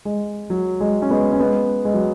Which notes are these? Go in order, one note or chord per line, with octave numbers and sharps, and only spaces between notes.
G#3
F#3
G#3
C#4
G#3 B3
C#4
G#3 B3
G#3
F#3